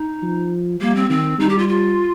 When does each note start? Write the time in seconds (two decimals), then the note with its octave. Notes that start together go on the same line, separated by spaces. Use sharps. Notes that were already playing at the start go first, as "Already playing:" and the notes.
Already playing: D#4
0.23 F3
0.81 G3 A#3
0.95 C4
1.10 D#3 C4
1.39 G3 D#4
1.49 G4
1.58 F4
1.68 F4